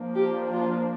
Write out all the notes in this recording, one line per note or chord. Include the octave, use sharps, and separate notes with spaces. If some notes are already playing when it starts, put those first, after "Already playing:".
Already playing: F3 A#3 D4
G4
F4